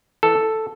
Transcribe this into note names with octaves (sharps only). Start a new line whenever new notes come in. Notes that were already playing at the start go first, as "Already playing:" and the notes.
E3 A4